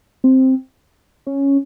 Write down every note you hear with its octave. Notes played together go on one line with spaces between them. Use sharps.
C4
C#4